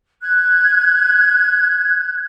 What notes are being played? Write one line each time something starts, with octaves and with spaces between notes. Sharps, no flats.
F#6 G#6